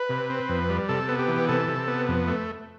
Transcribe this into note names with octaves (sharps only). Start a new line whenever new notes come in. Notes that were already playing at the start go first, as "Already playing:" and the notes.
Already playing: B4
C3
C4
F2
G3
C3 A4
B3
G4
E3
C3 A4
C3
B3
F2
A3